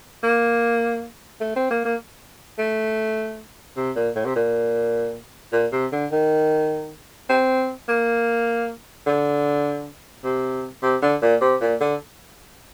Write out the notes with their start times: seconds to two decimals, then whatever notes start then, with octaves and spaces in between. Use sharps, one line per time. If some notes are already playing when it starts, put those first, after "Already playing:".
0.23 A#3
1.41 A3
1.56 C4
1.71 A#3
1.85 A#3
2.59 A3
3.77 C3
3.96 A#2
4.16 A2
4.26 C3
4.35 A#2
5.53 A#2
5.72 C3
5.92 D3
6.12 D#3
7.29 C4
7.88 A#3
9.06 D3
10.24 C3
10.82 C3
11.02 D3
11.22 A#2
11.41 C3
11.61 A#2
11.81 D3